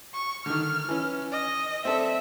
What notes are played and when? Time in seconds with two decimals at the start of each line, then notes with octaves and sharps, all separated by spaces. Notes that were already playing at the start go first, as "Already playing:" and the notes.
0.14 C#6
0.46 D3 D#3 F6
0.89 E3 C#4
1.32 D#5
1.85 C4 A4 D5 E5